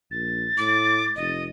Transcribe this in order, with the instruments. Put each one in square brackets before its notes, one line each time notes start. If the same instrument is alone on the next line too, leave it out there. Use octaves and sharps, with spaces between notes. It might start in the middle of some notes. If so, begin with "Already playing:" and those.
[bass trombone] A#1 [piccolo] A6
[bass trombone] A2 [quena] D6
[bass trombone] F1 [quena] D#5